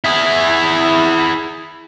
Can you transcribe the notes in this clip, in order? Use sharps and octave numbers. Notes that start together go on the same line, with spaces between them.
E4 G#4